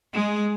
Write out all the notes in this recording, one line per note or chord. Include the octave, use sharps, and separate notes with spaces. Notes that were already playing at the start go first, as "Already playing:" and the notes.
G#3